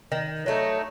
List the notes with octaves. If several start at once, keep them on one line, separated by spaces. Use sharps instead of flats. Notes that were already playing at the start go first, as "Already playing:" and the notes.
D#3
F#3 A3 D#4